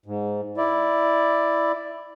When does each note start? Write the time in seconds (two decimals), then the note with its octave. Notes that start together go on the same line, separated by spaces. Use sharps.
0.06 G#2
0.57 E4 D5